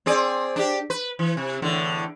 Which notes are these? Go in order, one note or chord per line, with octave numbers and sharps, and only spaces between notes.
C4 G#4 D5
D4 G4
B4
E3
C3
E2 A2 D3